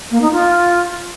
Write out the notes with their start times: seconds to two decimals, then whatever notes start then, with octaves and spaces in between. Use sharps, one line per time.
0.11 A#3
0.21 D#4
0.32 F4